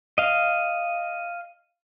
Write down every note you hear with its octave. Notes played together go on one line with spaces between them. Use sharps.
D#5 F5